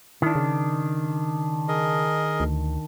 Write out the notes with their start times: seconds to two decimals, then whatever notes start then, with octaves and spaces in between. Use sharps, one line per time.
0.22 D#3 D4 E4
0.35 C#3
1.68 G#4 A#4 D#5
2.40 D2